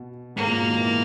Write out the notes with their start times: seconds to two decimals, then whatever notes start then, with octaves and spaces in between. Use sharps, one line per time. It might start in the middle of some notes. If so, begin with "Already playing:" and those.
Already playing: B2
0.36 G#2 A#3
0.48 A#2
0.59 B2
0.69 D#3
0.81 E3